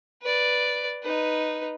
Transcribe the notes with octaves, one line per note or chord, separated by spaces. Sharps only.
B4 D5
D#4 B4